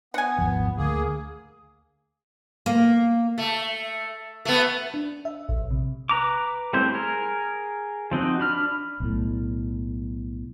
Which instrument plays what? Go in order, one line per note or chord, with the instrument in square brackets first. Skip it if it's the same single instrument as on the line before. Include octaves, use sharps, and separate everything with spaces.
[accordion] B3 [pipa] F#5 G#5
[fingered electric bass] G#1 D#2 F3
[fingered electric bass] D2 [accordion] A#3 G#4
[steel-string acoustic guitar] A#3
[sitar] A3
A3 B3
[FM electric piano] D4
E5
A#1
C3
[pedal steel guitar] B4 A#5 D6
G3 A3 C4 E4 C5
G#4 A#4
F3 C4 D#4 F#4
D4 B5 F6
[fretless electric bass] B1 A2